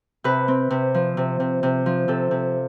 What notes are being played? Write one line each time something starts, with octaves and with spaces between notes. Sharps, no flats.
C3 B4
C4
C3
F3
C3
C3
C3
F3
C3 A4
C3